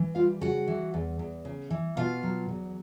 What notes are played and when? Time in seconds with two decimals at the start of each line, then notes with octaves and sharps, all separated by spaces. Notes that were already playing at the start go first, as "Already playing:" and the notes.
Already playing: E3
0.15 G3 F4 F5
0.41 C#3 F#4 F#5
0.67 E3
0.94 E2
1.19 E2
1.45 C#3
1.70 E3
1.97 B2 F4 F5
2.23 F#3
2.48 E2